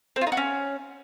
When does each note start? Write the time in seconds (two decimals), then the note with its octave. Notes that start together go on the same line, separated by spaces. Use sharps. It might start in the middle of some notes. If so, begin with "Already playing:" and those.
0.16 C4
0.21 F4
0.27 D#4
0.32 F#4
0.37 C#4